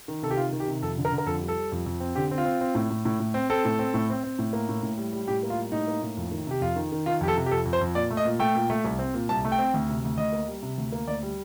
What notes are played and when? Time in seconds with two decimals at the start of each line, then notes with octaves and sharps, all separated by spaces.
0.08 D#3
0.22 C3 A4
0.31 G4
0.37 D#3 F4
0.53 D#3
0.60 G4
0.67 C3
0.82 F2 A4
0.97 D3
1.05 A#4
1.12 D3
1.18 A#4
1.26 F2 A4
1.41 G3
1.48 A4
1.56 G3
1.72 F2
1.86 F2
2.00 C4
2.15 D3 G4
2.31 C4
2.38 F4
2.45 C4
2.61 C4
2.75 A2
2.90 A2
3.05 A2
3.20 A2
3.34 C4
3.50 C4 A4
3.65 A2
3.79 C4
3.94 A2
4.10 C4
4.24 C4
4.39 A2
4.53 A#3
4.69 A2
4.83 A2
4.98 G3
5.13 G3
5.28 A2 G4
5.43 A#3
5.50 F4
5.57 G3
5.72 A2 D#4
5.88 A#3
6.03 A2
6.17 F2
6.31 D#3
6.47 C3 G4
6.61 F2 F4
6.76 D#3
6.92 D#3
7.06 D#3 F4
7.21 F2 G4
7.28 A4
7.36 C3
7.46 G4
7.51 F2 A4
7.65 F2
7.73 C5
7.81 F2
7.95 A#2 D5
8.11 A3
8.17 D#5
8.25 A#2
8.39 A3 G5
8.55 A#2
8.70 A3
8.84 C2
8.99 C4
9.14 A#2
9.29 C2 A5
9.45 A3
9.52 G5
9.58 C4
9.74 D2
9.89 C3
10.04 D2
10.18 D2 D#5
10.32 A#3
10.48 G3
10.62 C3
10.78 D2
10.92 A#3
11.08 D2 D5
11.23 G3